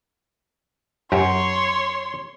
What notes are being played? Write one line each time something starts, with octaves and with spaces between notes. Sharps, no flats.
F#2 G4 C#5 A#5 C6